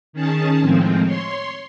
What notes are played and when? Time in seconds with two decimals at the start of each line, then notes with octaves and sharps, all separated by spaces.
0.13 D#3 C#4 G#4 A5
0.61 A2 D#3 F3 G#3 C4
1.03 C#5 C6